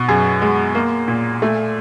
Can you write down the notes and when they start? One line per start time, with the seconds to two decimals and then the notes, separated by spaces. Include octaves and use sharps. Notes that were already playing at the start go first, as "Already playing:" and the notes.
Already playing: B2
0.08 F#2 G#4
0.42 G#3
0.75 A#3
1.08 A#2
1.42 A3